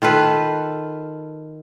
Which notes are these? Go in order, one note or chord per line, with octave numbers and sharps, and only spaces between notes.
D#3 F4 A4 B4